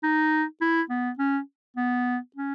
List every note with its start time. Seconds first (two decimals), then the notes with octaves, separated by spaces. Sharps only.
0.03 D#4
0.61 E4
0.90 B3
1.19 C#4
1.77 B3
2.36 C#4